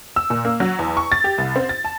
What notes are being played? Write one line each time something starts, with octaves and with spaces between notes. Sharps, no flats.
E6
A#2
A#3
F#3
E2
C#6
A6
G4
C2
C4
A6
A5